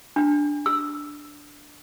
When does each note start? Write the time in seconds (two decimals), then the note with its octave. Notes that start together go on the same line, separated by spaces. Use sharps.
0.16 D4
0.66 E6